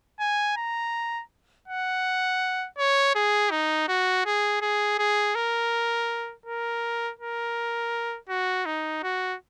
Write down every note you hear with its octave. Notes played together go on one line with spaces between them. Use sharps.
G#5
A#5
F#5
C#5
G#4
D#4
F#4
G#4
G#4
G#4
A#4
A#4
A#4
F#4
D#4
F#4